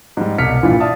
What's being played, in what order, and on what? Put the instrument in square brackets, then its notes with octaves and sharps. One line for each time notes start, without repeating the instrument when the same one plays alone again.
[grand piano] G#2 G3
C2 B2 F6 B6 C#7
G2 A#2 E3 F3 E4 F4
D5 E5 F5 A5 D#6